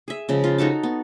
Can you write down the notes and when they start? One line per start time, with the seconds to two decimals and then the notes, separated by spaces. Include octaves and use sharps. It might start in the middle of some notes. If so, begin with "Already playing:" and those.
0.08 G#4 E5
0.29 C#3 F3 G#3
0.44 F4
0.58 D#4 F#4 A4 A5
0.83 B3